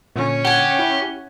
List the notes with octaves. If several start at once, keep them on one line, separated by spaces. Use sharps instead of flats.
A#2 D3 C#4
G4 F#5 G#5
E4